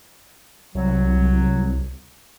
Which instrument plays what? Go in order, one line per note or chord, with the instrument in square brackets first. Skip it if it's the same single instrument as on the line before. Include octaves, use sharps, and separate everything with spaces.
[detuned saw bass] C2 [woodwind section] F#3